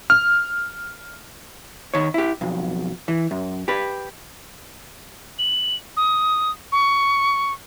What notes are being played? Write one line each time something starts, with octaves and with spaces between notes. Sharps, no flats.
F6
D#3 C#5
E4 G4
B1 F2
E3
F#2
G4 B4
F#7
D#6
C#6